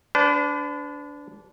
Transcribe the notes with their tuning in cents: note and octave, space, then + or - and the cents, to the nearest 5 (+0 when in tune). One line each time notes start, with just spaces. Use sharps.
D4 -20 B4 +40